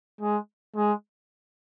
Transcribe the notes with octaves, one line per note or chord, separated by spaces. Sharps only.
G#3
G#3